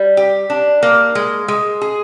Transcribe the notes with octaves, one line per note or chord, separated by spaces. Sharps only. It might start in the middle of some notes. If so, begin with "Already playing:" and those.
Already playing: G3
G4
D4
A#3
G#3
G#3
G#4